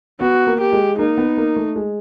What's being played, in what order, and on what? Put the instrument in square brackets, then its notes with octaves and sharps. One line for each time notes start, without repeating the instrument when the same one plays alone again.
[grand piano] B3 [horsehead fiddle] F#4
[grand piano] A#3
[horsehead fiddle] G4
[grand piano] G#3
[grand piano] A#3 [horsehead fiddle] D#4
[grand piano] B3
A#3
A3
G#3